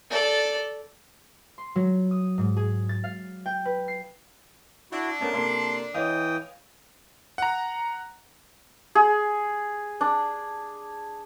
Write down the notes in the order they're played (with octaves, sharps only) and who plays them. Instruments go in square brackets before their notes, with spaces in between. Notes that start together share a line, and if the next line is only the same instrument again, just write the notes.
[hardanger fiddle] A4 D5
[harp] C6
F#3
D#6
G#2
G#4
A6
F5
G5
B4
C7
[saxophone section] D4 [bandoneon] E4 F#4
[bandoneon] A3 B3 A5 [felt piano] C#4 A#4
[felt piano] C3 A#3 A4 [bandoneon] C6
[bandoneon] E3 G5 D#6 [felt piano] C#5 D#5 F5
[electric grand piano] F#5 A#5
[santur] G#4
D4